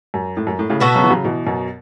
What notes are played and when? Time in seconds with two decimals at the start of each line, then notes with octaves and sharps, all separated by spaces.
0.14 F#2
0.37 A2
0.47 F#2
0.59 A2
0.69 A2 C#3
0.80 B2 B3 F#4 A4
0.95 C#3 F#3
1.04 E3
1.10 C#3 F#3
1.24 B2 E3
1.47 F#2 B2